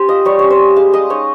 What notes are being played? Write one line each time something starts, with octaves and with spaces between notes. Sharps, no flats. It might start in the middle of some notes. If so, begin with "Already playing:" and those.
Already playing: C#4 G4 C5
F4 D#5
G3 C#5
C#4 C#5
C5
G3
G#3 F5
G#3 D#5
D#4 C#5